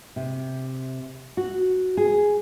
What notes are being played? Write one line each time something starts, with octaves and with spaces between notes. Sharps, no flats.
C3
F#4
G#4